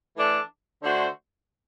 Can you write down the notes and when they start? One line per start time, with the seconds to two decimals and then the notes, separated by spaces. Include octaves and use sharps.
0.16 E3 A3 D4 A4
0.83 D3 A3 D4 F#4 C5